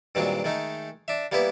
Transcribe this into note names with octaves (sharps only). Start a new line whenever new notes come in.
G2 A#2 D#3 F#3 G#3 C4
D#3 G#3 A3 D#4
D4 E5
G3 A#3 B3 E4 B4